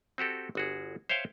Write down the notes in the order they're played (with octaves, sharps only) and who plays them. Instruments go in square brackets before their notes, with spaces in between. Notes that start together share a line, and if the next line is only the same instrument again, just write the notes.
[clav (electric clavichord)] C4 F#4 G4 A4
G1 F#4 G#4
C5 C#5 E5 F5 G5